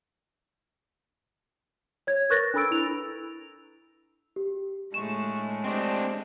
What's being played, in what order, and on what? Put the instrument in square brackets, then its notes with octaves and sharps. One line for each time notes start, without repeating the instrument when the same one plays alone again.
[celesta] C#5 G#6
A#4 B4 C#6 F#6 A6 A#6
D4 A4 B5 E6 D7
E4 F7
G4
[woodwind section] A2 D4 C#6 [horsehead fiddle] G#3 A3 [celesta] E7
[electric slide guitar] C4 D4 [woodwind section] G4 D5 D#5